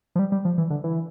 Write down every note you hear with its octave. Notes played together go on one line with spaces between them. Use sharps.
F3
G3
G3
F3
E3
D3
E3